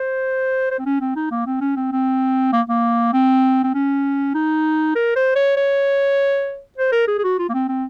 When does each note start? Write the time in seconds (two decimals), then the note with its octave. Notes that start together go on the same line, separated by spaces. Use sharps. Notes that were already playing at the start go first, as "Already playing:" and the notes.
Already playing: C5
0.71 C5
0.79 C4
0.86 C#4
1.01 C4
1.16 D#4
1.31 A#3
1.46 C4
1.61 C#4
1.76 C4
1.92 C4
2.53 A#3
2.69 A#3
3.13 C4
3.63 C4
3.74 C#4
4.34 D#4
4.95 A#4
5.16 C5
5.36 C#5
5.57 C#5
6.78 C5
6.92 A#4
7.08 G#4
7.18 G#4
7.24 F#4
7.39 F4
7.49 A#3
7.54 C4
7.69 C4